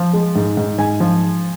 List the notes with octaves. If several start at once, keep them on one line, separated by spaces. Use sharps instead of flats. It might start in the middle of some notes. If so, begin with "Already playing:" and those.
Already playing: F3
G#3
G#2
G#2
G#2 G#5
F3